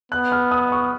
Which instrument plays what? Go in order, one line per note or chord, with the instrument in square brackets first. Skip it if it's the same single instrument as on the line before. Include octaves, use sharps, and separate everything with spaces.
[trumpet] B3 [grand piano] F#6
[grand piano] F6
D#6
C#6